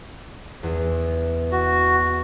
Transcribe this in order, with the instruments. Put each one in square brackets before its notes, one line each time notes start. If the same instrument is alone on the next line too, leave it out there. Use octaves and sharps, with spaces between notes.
[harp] E2
[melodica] F#4